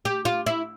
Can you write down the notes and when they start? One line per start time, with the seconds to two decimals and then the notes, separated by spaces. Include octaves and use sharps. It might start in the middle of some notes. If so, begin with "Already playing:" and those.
0.05 G4
0.25 F4
0.46 E4